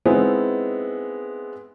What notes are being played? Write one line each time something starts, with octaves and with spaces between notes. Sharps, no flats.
G#3 B3 C4 D#4 E4 G#4